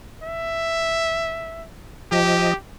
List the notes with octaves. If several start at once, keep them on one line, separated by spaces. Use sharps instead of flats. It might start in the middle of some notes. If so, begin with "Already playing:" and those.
E5
F3 G4 D#5